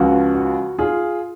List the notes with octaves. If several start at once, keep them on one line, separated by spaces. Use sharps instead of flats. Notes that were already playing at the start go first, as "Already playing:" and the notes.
Already playing: C#2 C#3 F3 F#4
F#4
F4 G#4